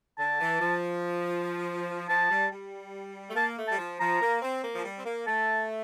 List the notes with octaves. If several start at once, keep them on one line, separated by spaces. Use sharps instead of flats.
D3 A5
E3
F3
F3 A5
G3
G3
A3
A#3 A5
A3
G3 A5
F3
F3 A#5
A#3
C4
A#3
F3
G3
C4
A#3
A3 A5